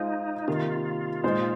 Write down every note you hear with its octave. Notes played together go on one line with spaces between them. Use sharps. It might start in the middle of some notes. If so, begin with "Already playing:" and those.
Already playing: G#3 D#4 F4 C5
C3 D#3 A#3 F4
A#2 G#3 D#4 C5